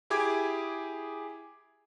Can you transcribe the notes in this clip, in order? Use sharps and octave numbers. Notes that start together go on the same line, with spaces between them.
E4 G4 G#4 G#5 D6 G#6